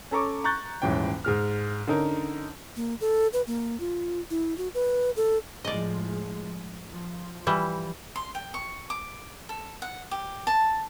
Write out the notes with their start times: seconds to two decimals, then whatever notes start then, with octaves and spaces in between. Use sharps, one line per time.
0.11 C#4 A4 A#5 C#6 D6
0.44 A#5 C#6 F#6 G6 A6
0.82 D#1 G#2 E3 C#4 G5
1.25 G#2 G#3 F6
1.87 D3 C#4 D#4 A#4
2.76 A#3
3.01 A4
3.33 B4
3.47 A#3
3.80 F4
4.30 E4
4.58 F#4
4.74 B4
5.16 A4
5.64 A2 F3 G#3 D5 D#5
6.89 F3
7.47 E3 G3
8.16 C6
8.35 G5
8.54 C#6
8.90 D6
9.49 A4
9.82 F#5
10.11 G4
10.47 A5